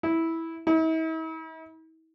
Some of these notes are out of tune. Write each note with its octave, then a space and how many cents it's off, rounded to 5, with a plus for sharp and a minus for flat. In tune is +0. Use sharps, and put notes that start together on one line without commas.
E4 -10
E4 -45